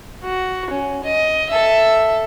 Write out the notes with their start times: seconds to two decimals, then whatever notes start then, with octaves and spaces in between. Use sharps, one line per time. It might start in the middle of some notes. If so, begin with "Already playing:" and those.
0.23 F#4
0.70 C#4
1.04 D#5
1.50 A4 E5